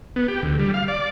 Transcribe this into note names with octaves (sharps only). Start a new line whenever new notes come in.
B3
G4
D2
G3
F5
D5